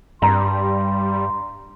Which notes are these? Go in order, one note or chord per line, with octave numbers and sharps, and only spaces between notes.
G2 G3 A#5 C6